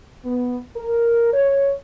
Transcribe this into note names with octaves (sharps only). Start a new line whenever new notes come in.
B3
A#4
C#5